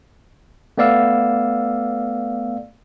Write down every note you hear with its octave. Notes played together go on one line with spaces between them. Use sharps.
A3 B3 D5 F5 E6